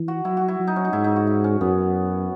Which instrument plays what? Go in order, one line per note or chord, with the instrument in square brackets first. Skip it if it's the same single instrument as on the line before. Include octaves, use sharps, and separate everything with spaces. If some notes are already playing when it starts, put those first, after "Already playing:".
Already playing: [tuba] E3
[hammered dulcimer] F#4
[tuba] F#3 [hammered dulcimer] E4
[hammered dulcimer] F#4
E4
[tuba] F#3
[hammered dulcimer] D#4
C#4
D#4
[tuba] G#2 [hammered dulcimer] E4
[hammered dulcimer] D#4
F#4
E4
C#4
[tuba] F#2 [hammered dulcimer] B3